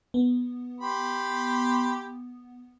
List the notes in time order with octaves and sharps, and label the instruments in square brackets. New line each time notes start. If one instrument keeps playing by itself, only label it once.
[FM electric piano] B3
[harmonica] G4 B5 C6